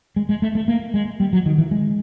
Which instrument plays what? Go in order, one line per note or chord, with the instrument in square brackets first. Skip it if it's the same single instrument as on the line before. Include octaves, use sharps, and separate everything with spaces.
[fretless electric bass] G#3
G#3
A3
A3
A#3
G#3
G3
F#3
D#3
E3
G#3